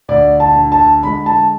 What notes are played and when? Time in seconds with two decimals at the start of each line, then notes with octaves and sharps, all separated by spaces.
0.08 D2 D5
0.40 A5
0.56 D3
0.72 A5
1.03 G#3 B5
1.26 A5